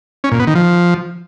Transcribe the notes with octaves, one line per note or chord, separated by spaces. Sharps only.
C#4
A#2
B3
D#3
F3